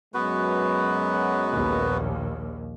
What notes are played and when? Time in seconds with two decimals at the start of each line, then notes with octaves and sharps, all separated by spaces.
0.14 F#2 F#3 G#3 B3 F#4 B4
1.51 A#1 D#2